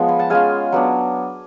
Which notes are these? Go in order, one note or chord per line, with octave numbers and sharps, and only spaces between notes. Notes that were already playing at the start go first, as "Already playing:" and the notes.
Already playing: F3 G#3 B3 F4 C#5
G#5 B5
F#5 A5
G#3 C#4 F4 F5 G#5
F#3 B3 D4